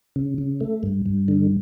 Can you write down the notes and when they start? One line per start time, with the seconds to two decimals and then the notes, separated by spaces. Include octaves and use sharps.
0.16 C#3
0.38 C#3
0.60 A3
0.83 G2
1.06 G2
1.28 D3